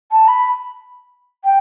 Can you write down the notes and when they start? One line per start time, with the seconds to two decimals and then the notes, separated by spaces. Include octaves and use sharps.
0.11 A5
0.27 B5
1.44 G5